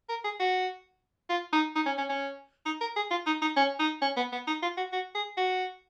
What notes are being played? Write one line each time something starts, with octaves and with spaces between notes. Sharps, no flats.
A#4
G#4
F#4
F4
D#4
D#4
C#4
C#4
C#4
D#4
A#4
G#4
F4
D#4
D#4
C#4
D#4
C#4
B3
B3
D#4
F4
F#4
F#4
G#4
F#4